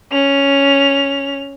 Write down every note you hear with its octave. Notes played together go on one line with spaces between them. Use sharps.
C#4 F7